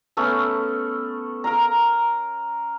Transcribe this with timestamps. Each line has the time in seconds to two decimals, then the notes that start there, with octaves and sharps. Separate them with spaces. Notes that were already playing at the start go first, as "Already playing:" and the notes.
0.17 A3 B3 C#4 A4
1.44 A#4 F5 A#5